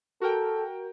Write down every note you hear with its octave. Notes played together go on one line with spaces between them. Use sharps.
F#4 A4 A#4 G5